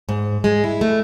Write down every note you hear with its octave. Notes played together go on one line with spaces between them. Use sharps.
G#2
G#3
E4
A3